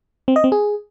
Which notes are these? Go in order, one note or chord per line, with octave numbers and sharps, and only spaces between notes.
C4
D#5
C4
G#4